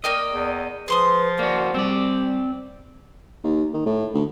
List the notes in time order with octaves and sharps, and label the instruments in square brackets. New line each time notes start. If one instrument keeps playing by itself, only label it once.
[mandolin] A#3 G5 F6 [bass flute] D5 [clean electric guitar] D#5
[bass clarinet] E2
[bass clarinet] F3 [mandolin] G#4 C6 D#6 [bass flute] B4
[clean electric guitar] A#3 F#4 [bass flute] D5
[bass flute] G3 [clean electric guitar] C4 D5
[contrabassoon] D#2
D#3
A2
D2